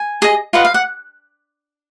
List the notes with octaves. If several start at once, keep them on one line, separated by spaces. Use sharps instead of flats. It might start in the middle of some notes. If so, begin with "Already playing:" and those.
Already playing: G#5
G#4 D#5
F4 B4 D#5 F#5
F5
F#5